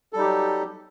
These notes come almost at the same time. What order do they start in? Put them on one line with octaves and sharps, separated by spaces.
A4 G3 D#4 G4 F#3